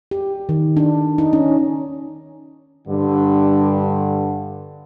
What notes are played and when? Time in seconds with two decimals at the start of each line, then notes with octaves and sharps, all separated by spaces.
0.11 G4
0.49 D#3
0.77 D4
1.18 D#4
1.33 C#4
2.88 G2 D3